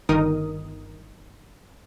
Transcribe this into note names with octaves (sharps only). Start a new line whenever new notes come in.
G1 D#3 D#4 A#4 D#6